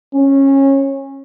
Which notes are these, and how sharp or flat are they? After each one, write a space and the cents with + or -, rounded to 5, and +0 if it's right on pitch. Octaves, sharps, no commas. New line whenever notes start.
C#4 -20